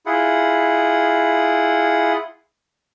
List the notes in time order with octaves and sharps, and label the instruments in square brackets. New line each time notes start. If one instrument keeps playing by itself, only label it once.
[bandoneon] E4 F4 G#4 F#5